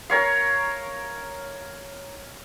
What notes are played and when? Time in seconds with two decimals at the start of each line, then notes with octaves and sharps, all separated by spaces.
0.10 A#4 C#5 F5